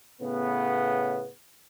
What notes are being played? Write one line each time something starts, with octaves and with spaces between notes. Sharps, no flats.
A2 C#3 B3